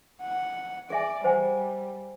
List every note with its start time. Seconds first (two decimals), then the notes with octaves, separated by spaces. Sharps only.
0.22 F#5
0.90 G#4 D5 E5 G#5
1.24 G3 C5 F#5 G#5